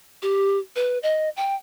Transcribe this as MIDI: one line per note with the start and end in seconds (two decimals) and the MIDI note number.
0.22 0.59 67
0.76 0.98 71
1.03 1.29 75
1.37 1.55 79